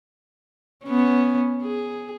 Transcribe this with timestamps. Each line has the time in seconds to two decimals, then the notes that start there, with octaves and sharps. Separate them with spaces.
0.84 B3 C#4
1.62 G#4